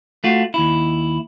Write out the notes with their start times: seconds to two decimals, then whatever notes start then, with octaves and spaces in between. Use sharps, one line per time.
0.24 A3 F4 F#4
0.54 D#2 E4